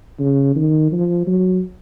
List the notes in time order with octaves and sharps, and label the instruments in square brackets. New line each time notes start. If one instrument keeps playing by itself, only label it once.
[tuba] C#3
D#3
F3
F#3